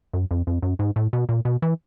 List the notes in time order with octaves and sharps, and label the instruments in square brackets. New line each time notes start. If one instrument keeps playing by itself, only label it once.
[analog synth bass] F#2
F2
F2
F#2
G#2
A2
B2
A#2
B2
E3